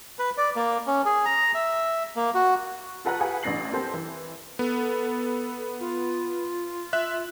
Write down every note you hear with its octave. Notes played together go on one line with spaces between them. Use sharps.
B4
D5
A#3
C#4
G#4
A#5
E5
A#3
F#4
F4 A4 B4 F#5 A#5 F#6
G4 G#4 B4 F5 F#5 G#5
A1 E3 D4 A#6 C7 F#7
A#3 C4 G4 A4 C5 G5
E3
B3 A4
F4
E5 F#6